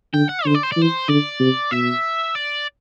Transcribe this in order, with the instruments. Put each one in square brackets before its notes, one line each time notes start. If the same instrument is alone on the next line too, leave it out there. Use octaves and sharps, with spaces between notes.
[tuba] D3 [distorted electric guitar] G5
[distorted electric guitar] F#5
[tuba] D3 [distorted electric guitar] C5
[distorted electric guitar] D5
C5
D5
[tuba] E3
[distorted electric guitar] C5
[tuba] D3 [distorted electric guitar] D5
[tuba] C3
[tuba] B2 [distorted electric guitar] E5
[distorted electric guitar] D5